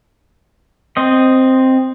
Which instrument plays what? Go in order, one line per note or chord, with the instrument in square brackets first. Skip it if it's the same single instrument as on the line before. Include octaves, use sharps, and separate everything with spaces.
[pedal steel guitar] C4 D#5